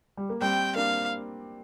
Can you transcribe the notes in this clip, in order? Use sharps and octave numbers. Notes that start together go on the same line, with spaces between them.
G3
A#3
G3 C4 G5
A#3 D4 F5